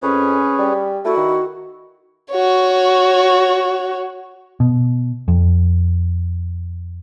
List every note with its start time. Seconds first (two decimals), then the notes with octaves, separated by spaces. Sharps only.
0.02 F2 C#4 G#4 B4 C#5
0.59 G3
1.05 A3 E4 F#4
1.17 D#3
2.31 F#4 C#5
4.60 B2
5.28 F2